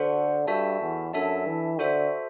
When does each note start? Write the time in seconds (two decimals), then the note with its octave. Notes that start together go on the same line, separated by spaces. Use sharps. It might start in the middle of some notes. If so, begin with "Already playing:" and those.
Already playing: D3 F#4 A4 C5 F#5
0.47 G2 F#4 A4 E5 A5
0.81 E2
1.13 F#2 D4 A4 E5 A5
1.47 E3
1.79 D3 F#4 A4 C5 E5